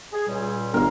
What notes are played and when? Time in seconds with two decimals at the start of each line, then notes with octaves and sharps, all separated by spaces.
0.13 G#4
0.27 C#2 A#2 G3
0.74 G1 A#4 F5